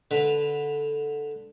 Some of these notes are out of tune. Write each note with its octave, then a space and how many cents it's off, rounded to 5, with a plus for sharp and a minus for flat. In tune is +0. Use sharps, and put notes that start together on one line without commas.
D3 +0 B4 +0